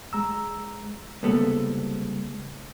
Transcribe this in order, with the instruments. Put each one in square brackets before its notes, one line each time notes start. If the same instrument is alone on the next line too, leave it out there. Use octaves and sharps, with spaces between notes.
[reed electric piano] G#3 A#5 E6
[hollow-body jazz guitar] C2 B3 A4 [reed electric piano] C#3 G#3 A#3